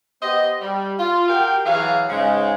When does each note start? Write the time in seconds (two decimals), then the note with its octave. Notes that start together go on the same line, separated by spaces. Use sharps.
0.23 B3 G4 C5 D#5
0.62 G3
0.99 F4
1.28 F#4 G4 A#4 F5 G5
1.66 E3 F#3 F#4 G#4 F5
2.10 G#2 C#3 G#3